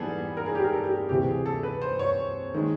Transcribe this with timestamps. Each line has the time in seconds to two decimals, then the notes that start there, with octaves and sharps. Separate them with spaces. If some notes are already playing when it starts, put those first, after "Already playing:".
Already playing: G#2 E3 G3 B3 G#4 A4
0.37 A#4
0.46 G#4
0.55 G4
0.64 A#4
0.73 A4
0.84 G4
0.91 G#4
1.09 D2 C3 E3 G4
1.27 G#4
1.46 A4
1.63 B4
1.82 C5
1.99 C#5
2.54 D#3 G#3